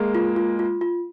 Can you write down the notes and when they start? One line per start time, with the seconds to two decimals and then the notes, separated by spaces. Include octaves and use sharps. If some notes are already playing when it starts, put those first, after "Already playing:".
Already playing: G#3 A#3 G#4
0.15 F4
0.36 F4
0.59 F4
0.81 F4